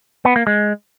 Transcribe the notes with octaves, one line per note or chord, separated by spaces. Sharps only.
B3
A#3
G#3